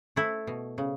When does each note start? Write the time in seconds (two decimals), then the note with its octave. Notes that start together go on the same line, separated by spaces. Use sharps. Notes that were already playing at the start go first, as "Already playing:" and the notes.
0.16 A3 E4
0.47 B2
0.78 C#3